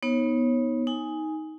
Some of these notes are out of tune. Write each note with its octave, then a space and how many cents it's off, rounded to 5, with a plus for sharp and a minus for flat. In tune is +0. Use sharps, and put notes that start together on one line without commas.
B3 -10 D#4 +10 C#5 -25
D#4 +15 G#5 +0